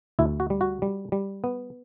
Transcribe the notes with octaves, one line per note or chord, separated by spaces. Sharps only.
D2 E4
F#4
G3
F#4
G3
G3
B3